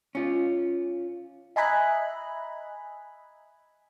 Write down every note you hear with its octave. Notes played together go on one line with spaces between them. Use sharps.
C#4 F4
D#5 E5 G#5 A#5 B5 F#6